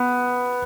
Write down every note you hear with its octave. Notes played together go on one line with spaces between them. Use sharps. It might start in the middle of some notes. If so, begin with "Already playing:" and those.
Already playing: B3